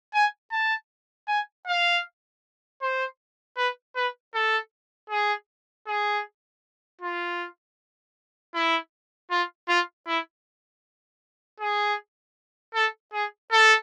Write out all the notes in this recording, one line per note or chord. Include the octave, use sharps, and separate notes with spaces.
G#5
A5
G#5
F5
C5
B4
B4
A4
G#4
G#4
F4
E4
F4
F4
E4
G#4
A4
G#4
A4